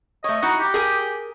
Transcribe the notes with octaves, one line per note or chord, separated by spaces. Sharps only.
A3 C#5 D#5
D#4 E4 F#4
G4
G#4 A#4 G#5